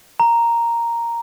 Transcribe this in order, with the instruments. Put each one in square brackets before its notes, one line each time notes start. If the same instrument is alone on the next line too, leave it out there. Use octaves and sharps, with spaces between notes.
[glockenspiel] A#5